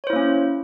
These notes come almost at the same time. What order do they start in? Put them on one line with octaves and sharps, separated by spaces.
C#5 C5 E4 A#3 C#4